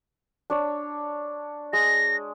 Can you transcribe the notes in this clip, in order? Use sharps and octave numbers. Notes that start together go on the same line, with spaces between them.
D4 C#5
G#3 A#6